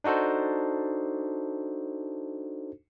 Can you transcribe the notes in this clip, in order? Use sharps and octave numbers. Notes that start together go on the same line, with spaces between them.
D4 D#4 F#4 A4 C5